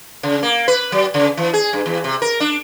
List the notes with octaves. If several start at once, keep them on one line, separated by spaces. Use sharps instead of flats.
C#3
A#3
B4
F#3
C#3
E3
G#4
G2
E2
C3
A#4
D4